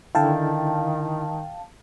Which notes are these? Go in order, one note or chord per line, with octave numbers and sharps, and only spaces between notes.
D3 D#3 E4 F5 G5 A5